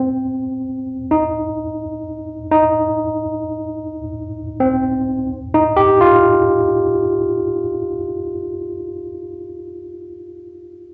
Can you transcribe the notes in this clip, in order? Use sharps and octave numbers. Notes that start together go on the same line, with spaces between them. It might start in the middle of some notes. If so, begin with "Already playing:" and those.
Already playing: C4
D#4
D#4
C4
D#4
G4
F4